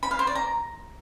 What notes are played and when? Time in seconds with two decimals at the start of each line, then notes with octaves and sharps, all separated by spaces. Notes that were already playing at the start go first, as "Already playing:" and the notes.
0.03 B5
0.11 F5
0.19 C5
0.27 D5
0.35 A#5